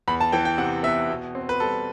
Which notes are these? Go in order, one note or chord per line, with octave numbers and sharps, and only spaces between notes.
E2 B5
A5
E3 G5
G5
C3 F#5
B3 E5
B2
C4
B4
G3 A4